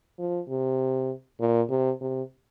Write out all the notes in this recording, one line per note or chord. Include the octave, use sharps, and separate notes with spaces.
F3
C3
A#2
C3
C3